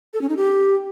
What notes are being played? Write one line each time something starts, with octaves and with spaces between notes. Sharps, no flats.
A4
C#4
D#4
G4